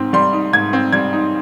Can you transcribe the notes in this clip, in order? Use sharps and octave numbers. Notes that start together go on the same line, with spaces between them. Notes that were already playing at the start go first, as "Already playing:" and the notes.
Already playing: G#2 C4
G3 C6
D#4
G#2 G#6
C4
G3 G#6
D#4